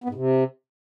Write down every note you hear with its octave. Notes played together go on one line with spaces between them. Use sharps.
B3
G#2
C3